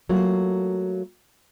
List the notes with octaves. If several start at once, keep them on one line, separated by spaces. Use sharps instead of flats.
F#3 A3 A#3 F4